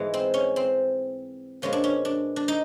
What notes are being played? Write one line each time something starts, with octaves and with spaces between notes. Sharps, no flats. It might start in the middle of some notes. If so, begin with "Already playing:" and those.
Already playing: G#2 E3 G#3 B3
C4
C#4
C4
A#2 F3 G#3 B3 C#4
D4
C#4
D4
D4
D#4